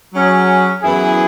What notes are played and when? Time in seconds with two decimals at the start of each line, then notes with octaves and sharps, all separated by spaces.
0.13 F#3 C#4 G#4
0.82 F#2 E3 B3 E4 G#4